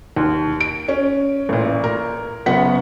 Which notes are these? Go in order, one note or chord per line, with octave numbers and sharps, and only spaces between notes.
D#2
D7
C#4
A1 A#2
A#4
F#1 F#2 B3 F#5 B6